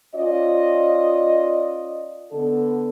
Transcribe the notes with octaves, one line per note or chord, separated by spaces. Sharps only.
C#4 F4 D5 D#5
D3 B3 A4